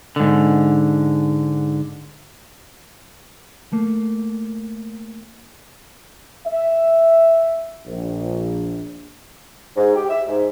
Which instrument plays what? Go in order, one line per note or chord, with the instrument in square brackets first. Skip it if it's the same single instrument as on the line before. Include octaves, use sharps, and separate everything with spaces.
[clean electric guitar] G#2 D3
A3 A#3
[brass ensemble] E5
A#1
[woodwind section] G#2
G4
E5
G#2